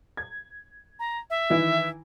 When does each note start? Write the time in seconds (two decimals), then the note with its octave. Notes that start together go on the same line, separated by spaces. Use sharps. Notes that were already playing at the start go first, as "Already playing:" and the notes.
0.17 G#6
0.99 A#5
1.30 E5
1.50 D#3 E3 E4